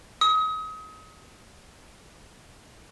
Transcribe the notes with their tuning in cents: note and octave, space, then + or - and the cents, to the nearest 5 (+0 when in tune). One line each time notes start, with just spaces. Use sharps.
D#6 +35